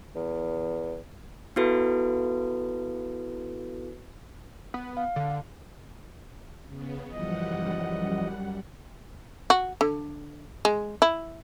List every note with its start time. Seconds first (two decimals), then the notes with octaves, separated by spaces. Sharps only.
0.16 E2
1.56 B3 E4 F#4 A4 B4
4.74 B3
4.97 F5
5.16 D3
6.65 C#3 B3
7.12 F#2 E3 F3 G3 D#5 F#5
9.50 F#4
9.81 D3
10.65 G#3
11.02 E4